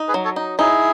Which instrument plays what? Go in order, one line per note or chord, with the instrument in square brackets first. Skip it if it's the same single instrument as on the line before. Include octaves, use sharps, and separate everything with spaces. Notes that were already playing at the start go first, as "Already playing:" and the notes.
Already playing: [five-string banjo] D#4
[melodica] G#4 B4
[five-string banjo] F#3
[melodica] A4 C#5
[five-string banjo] D#4
[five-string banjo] D#4 [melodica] E4 G#4